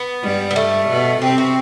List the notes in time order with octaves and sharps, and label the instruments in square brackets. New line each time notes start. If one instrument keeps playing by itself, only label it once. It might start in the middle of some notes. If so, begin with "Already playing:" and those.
Already playing: [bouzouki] B3
[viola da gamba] G2 G3
[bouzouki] B3
A3
[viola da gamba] B2 B3
[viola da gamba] C3 C4 [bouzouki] G4
[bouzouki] F#4